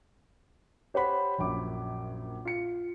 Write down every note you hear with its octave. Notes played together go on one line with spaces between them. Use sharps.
G4 C5 C#5 F#5 B5
A#1 F#2 D6
F4 C#7